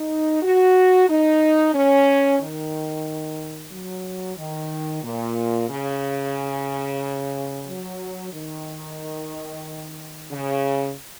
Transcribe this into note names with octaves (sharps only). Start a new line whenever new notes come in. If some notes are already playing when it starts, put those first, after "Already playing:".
Already playing: D#4
F#4
D#4
C#4
D#3
F#3
D#3
A#2
C#3
F#3
D#3
C#3